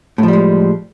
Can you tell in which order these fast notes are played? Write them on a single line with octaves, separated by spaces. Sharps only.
A2 F3 G3 G#3